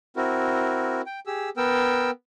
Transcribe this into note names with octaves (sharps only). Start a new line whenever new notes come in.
C4 E4 F#4 A#4
G5
G4 G#4 E6
B3 A#4 G5 E6